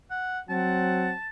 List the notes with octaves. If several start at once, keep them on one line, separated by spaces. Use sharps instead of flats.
F#5
F#3 C4 F#5 A5